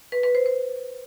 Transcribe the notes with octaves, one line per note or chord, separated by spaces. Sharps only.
B4
B4
C5
C5